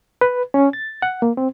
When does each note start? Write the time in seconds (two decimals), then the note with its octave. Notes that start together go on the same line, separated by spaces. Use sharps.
0.21 B4
0.54 C#4
0.73 A6
1.02 F#5
1.22 A#3
1.37 C4